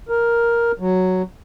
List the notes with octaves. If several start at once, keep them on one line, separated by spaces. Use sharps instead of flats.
A#4
F#3